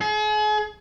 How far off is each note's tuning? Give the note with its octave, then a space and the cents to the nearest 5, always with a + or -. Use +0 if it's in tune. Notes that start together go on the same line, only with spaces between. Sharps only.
G#4 +40